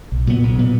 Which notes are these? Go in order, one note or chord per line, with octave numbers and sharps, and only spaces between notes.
B1
A#2 F#3 B3
B1
A#2 F#3 B3